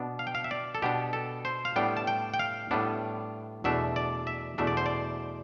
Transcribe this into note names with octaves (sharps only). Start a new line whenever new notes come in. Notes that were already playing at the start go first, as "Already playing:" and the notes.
Already playing: B2 B3 D4
F5
G5
F5
E5
D5
A4
B2 B3 D4 G4
A4
C5
F5
A2 G3 B3 D4 G5
A5
G5
G5
F5
A2 G3 B3 D4
E2 B2 A3 D4 E5
D5
E5
E2 B2 A3 D4 E5
D5
C5
D5